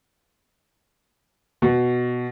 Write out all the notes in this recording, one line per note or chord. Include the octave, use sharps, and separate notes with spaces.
B2